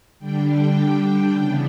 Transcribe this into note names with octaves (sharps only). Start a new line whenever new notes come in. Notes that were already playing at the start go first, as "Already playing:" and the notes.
D3 G3 D4 G5
G5
C#3 E3 B3 D4